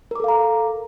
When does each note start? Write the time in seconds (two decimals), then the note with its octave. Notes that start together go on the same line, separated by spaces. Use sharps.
0.11 A#4
0.16 D6
0.20 A4
0.24 F5
0.28 A#5